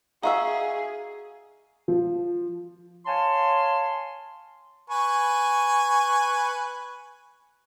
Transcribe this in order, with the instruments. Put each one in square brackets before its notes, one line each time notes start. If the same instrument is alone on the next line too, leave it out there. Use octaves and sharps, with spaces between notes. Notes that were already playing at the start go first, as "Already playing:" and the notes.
[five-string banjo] D#4 F#4 E5 [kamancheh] G#4 [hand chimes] F5
[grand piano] F3
[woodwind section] C#5 F5 G#5 A5 C6
[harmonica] B4 G#5 C#6